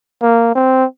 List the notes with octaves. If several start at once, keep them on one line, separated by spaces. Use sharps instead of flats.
A#3
C4